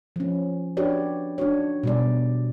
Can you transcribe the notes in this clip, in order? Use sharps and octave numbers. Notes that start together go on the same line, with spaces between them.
F3 C#4
D4 F#4 G4 B4 C#5 D5
D4 D#4 F#4 C#5
B2 G3 D5